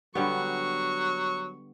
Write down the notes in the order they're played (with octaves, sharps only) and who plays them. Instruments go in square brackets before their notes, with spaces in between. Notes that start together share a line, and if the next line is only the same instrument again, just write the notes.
[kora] D3 G3 B3 [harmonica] F#3 [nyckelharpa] C#6